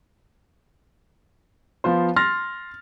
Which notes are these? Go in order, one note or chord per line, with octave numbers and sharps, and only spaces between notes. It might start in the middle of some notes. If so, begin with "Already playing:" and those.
F3 B3 F4 C5
C6 F6 A6 A#6